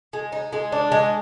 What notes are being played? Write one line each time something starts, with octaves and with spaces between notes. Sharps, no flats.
G#3
D#4
G#3
D4
G#3